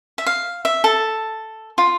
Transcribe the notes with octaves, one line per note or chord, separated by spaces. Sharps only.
E5
F5
E5
A4
F4